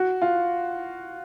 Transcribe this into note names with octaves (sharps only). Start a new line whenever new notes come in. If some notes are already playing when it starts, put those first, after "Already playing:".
Already playing: F#4
F4